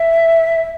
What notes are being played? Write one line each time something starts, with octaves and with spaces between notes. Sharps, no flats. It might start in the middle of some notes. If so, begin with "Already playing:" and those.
Already playing: E5